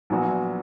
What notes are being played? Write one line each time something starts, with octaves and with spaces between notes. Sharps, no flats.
A#1 A#2 F#3 B3 F#4